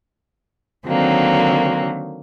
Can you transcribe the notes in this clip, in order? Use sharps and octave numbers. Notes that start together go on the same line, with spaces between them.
D3 D#3 F#3 A#3 C4